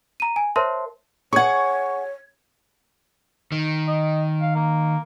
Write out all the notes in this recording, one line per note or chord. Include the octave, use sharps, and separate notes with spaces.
A#5 D#7
G#5
A#4 C5 C#5 E5 A5 C6
G#4 C#5 F#5 C#6 G#6
D#3
D#5
F5
A#3